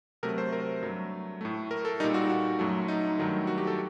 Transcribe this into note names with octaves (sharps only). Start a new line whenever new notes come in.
C3 F#3 A3 A#4
C5
A#4
G2 F#3 A3
A2 A3
A#4
A4
A#2 G3 D#4
F#4
F#4
F#2 F#3 A3
D#4
G2 D#3 F#3 A3
F#4
G4
A4